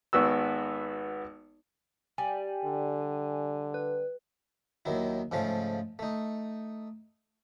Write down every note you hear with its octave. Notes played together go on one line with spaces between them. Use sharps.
G#1 B3 F#4 E6
G3 G#5
D3
B4
D#2 D#3 F#3 E4
G#2 C#3 F3 A3 F4
A3 D#4